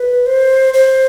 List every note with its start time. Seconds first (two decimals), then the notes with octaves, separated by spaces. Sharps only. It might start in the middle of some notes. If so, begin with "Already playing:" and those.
Already playing: B4
0.26 C5
0.74 C5